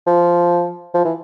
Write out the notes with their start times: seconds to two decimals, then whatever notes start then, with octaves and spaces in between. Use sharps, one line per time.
0.07 F3
0.94 F3
1.05 E3